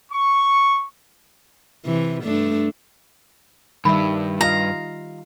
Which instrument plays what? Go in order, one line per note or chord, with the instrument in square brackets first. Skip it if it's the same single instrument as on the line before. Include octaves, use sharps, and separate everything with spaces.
[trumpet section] C#6
[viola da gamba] C3 E3
G2 A3 D4
[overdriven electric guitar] G2 [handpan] D#3 G3 E5 [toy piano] B5
[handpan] F4 D#5 F5 [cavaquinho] A#5